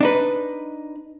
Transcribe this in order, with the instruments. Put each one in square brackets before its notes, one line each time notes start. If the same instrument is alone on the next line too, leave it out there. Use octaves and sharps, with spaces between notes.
[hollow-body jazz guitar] D4 D#4 B4